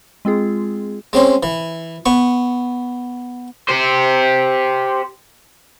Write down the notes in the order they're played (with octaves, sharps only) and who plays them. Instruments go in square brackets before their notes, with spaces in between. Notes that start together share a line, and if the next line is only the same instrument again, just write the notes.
[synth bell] G#3 C4 F4 G#4
[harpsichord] G#3 C4 C#4
E3
B3 C#6
[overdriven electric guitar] G4 C5